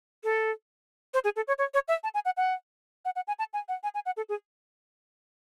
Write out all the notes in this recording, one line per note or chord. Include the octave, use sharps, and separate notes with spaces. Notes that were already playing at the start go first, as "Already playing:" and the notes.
A4
C5
G#4
A4
C#5
C#5
C#5
E5
A5
G#5
F#5
F#5
F#5
F#5
G#5
A5
G#5
F#5
G#5
G#5
F#5
A4
G#4